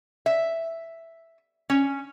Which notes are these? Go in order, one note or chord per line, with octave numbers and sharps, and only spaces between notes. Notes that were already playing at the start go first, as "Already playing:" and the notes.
E5
C#4